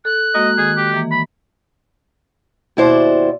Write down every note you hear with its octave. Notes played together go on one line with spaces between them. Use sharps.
A4 F#6
G#3 A#3 F#4 D#5
D#3 G#4
G4
E3 A#3
B5
D#2 B2 E4 F#4 C5 D5